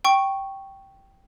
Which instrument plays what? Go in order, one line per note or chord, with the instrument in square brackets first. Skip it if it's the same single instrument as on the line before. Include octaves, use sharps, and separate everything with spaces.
[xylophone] G5 C#6